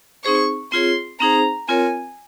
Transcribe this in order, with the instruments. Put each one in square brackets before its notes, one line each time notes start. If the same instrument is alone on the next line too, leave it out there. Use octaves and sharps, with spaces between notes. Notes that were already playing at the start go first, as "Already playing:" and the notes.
[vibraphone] C4 D#4 G#4 C5 [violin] C#6
[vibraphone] C4 F4 G#4 C#5 [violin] C6
[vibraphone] C4 D#4 G#4 C5 [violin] A#5
[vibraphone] C4 F4 A#4 C#5 [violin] G#5